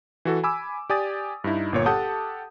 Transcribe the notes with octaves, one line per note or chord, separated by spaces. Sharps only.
E3 F#4 A4
G#5 B5 D6 E6
G4 D5 G#5 D#6 A6
G2 D#4 E4
G1 A#2 C#5
G4 A4 F#5 A5 D#6 G6